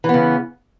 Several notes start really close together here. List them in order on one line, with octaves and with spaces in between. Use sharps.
E3 B3 C#3